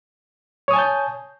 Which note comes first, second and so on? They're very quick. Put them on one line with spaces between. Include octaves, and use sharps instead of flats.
C#5 D#6 G#5 A5 G6